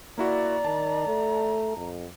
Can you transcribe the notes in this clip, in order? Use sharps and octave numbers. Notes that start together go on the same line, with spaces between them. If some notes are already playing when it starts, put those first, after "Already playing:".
A#3 E4 F#4 D5 A#5
D#3 A5
A3
F2